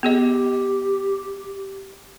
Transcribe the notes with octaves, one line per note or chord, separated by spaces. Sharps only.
B3 G4 G#4 D#5